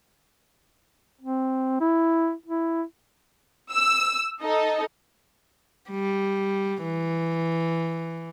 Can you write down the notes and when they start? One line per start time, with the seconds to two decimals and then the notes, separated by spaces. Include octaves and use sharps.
1.21 C4
1.81 E4
2.46 E4
3.72 E6
4.41 D#4 A4 D#5
5.90 G3
6.83 E3